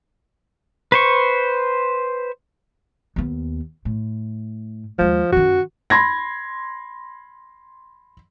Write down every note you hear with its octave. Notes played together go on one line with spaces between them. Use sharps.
B4 C5 C#6
D#2 B3
A2
D#2 F3 G#3
F#2 D#3 F#4
B5 C6 G#6 A#6